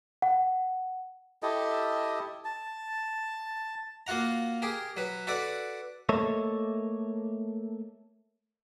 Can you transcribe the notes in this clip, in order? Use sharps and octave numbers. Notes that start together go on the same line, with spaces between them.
F#5
E4 G4 A4 D#5
A5
A#3 F4 F#4 F#5 A#5
G4 G#4 A#4
F#3 B4
F#4 A4 B4 D5 F#5
A3 A#3 A4 C#5 D#5 E5